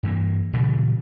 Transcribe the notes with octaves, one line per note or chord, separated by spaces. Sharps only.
G2 E3 A#3
A#2 C#3 E3 G3